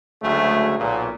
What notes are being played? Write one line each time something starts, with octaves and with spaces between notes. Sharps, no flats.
D2 C#3 F#3 G#3 A3
B1 A#2